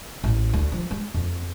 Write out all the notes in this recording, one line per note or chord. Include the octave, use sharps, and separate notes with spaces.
A1
D2
F3
G#3
F2